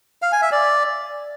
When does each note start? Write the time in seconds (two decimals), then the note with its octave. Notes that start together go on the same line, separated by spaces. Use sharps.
0.22 F5
0.32 G#5
0.42 E5
0.52 D5